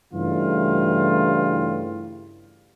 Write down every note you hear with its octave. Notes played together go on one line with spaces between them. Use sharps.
G2 C#3 E3 G3 A3 F4